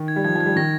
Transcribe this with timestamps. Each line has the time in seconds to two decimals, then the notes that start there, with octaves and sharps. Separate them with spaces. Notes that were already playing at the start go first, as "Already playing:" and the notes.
Already playing: D#3
0.08 G#6
0.16 G3
0.24 F3 G#6
0.35 F3
0.41 G#6
0.46 G3
0.56 D#3 A#6